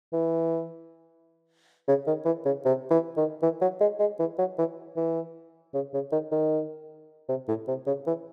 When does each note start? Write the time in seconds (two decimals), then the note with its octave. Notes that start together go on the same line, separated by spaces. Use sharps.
0.13 E3
1.88 C#3
2.07 D#3
2.25 E3
2.46 C#3
2.65 C3
2.91 E3
3.17 D#3
3.43 E3
3.62 F#3
3.81 G#3
4.00 G#3
4.19 E3
4.39 F#3
4.58 E3
4.97 E3
5.74 C#3
5.94 C#3
6.12 D#3
6.32 D#3
7.29 C3
7.48 A2
7.68 C3
7.86 C#3
8.07 E3